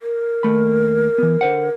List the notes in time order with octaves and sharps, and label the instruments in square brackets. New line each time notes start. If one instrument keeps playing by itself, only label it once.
[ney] A#4
[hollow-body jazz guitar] D#2 A3 B5
E3 B3
D3 C5 F#5